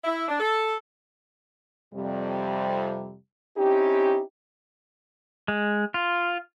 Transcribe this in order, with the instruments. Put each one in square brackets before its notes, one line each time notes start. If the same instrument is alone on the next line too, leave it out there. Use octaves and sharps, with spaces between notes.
[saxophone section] E4
D4
A4
[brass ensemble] F2 C3 G3
C4 C#4 D#4 E4 G4
[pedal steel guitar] G#3
F4